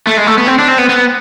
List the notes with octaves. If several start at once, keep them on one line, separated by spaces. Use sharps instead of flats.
A3
G#3
A3
B3
C4
D4
C4
B3
B3